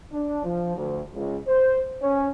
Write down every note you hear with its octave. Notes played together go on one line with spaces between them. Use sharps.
D4
F3
D2
C#2
C5
C#4